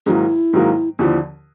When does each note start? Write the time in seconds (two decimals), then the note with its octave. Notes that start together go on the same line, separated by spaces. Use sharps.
0.06 G#2 D#3 F#3 A#3 E4 G#4
0.53 G#2 D#3 F#3 A#3
0.99 D#2 D3 F3 E4